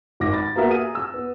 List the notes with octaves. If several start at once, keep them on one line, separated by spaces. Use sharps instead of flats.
G#1 D6 A#6
B5 A6
A#3 B3 F#4 A#4 E5
G#4 D#7
E6
B3